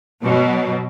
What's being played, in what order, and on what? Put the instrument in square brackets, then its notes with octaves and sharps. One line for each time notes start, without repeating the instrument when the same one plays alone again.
[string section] B2 F#3